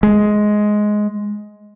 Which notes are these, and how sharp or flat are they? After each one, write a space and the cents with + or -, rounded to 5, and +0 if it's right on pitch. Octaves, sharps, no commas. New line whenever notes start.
G#3 +10